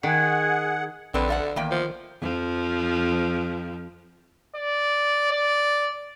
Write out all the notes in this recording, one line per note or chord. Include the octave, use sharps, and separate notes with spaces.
D#3 G#4 F#5
A#1 D3 C4 B4
A4 F5 F#5
E2 D#3 A#3 G5
F3
F2 F3
D5
D5